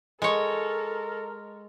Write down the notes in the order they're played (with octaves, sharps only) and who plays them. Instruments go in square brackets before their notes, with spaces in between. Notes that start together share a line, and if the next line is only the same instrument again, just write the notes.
[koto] G#3 C#5 [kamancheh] A4 [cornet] A#4 [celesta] D#5